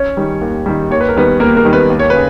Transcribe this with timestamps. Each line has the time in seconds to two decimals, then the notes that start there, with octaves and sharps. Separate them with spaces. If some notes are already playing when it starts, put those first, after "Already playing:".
Already playing: C#4 C#5
0.17 D#3 G3
0.41 D#2
0.66 D#3 G3
0.90 D#2 C#5
1.01 B4
1.09 A#4
1.16 D#3 G3 B3 B4
1.40 D#2 A#3 A#4
1.57 A#3 A#4
1.65 D#3 G3
1.73 B3 B4
1.90 D#2
1.99 C#5
2.10 C#3 B4